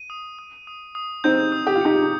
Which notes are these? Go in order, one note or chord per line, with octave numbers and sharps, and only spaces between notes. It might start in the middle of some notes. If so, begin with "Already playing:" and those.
Already playing: D#7
D#6
D#6
D#6
D#6
C4 D#4 G6
D#6
G4
F4
D#4 G4 C#7
D#4